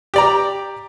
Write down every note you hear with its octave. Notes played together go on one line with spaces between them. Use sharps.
G4 D5 A#5